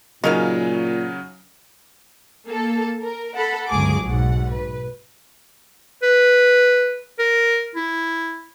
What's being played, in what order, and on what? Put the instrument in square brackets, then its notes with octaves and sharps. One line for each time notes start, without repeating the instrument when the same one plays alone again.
[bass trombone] A#2 [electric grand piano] C#3 F#3 C#4 [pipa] D#4 A#4 F5
[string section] A#3 A4
A#4
A4 F#5 B5
G1 C#2 F#3 G#4 D6
B1 G#2 F#5
B4
[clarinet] B4
A#4
E4